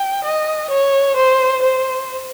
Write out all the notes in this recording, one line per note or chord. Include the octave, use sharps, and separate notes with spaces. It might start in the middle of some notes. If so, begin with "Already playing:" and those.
Already playing: G5
D#5
C#5
C5
C5